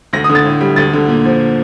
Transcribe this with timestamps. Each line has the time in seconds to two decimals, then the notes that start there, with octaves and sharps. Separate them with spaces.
0.13 D2 A#6
0.24 D#6
0.29 D3
0.35 A6
0.45 A2
0.61 G3
0.76 D2 A6
0.93 D3
1.08 A#2
1.25 F3